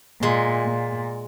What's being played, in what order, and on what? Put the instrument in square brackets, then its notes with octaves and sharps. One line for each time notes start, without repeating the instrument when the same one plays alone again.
[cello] A#2 [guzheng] G#3
[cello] A#2